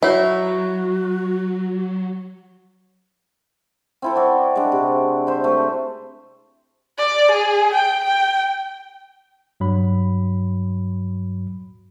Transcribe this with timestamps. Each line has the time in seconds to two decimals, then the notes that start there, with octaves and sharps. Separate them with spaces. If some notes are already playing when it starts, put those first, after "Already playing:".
0.03 F#3 E4 F#4 C#5 F#5
4.02 C4 E4 A4
4.16 F#4 D5
4.56 G#3 D4
4.72 C3
5.27 C5 E5
5.44 A3
6.98 D5
7.32 G#4
7.74 G5
8.04 G5
9.60 G2 F#3 B5